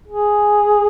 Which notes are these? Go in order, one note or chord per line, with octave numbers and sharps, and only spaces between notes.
G#4